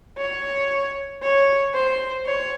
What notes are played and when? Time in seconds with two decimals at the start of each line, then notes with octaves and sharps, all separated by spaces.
0.18 C#5
1.22 C#5
1.73 C5
2.26 C#5